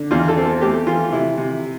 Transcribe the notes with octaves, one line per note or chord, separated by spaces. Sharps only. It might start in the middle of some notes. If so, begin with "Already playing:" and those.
Already playing: D3
E2 F4
A4
C4
A4
A3 G4
E3 F4
C3 E4
C3